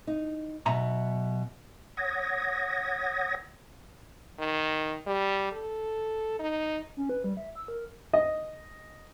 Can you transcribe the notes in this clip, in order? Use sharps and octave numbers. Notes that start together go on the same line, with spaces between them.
D#4
B1 B2 E5 A#5
C#5 F#5 D#6 G#6 A#6
D#3
G3
A4
D#4
C#4
B4
G3
E5
E6
A#4
D#5